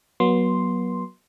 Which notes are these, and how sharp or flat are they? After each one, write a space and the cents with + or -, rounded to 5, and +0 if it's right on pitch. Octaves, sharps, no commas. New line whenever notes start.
F#3 +0 B3 -35 C6 +0